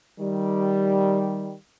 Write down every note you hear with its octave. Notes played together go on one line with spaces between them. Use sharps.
D#3 G3